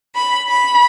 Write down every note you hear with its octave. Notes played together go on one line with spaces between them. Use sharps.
B5
B5